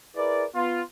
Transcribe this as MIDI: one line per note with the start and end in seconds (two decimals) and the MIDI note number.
0.16 0.45 64
0.16 0.45 68
0.16 0.45 70
0.16 0.45 71
0.16 0.45 74
0.55 0.82 59
0.55 0.82 65